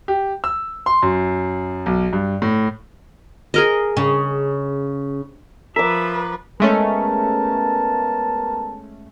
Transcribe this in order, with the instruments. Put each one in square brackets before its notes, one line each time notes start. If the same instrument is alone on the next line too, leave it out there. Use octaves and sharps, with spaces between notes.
[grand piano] G4
E6
C6
F#2
B1
G2
A2
[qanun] G#4 A#4 D#5
[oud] C#3
[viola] F3 B4 [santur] A#4 D6 [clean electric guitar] E5
[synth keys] G#3 A3 C#4 [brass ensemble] B3 A#4 A5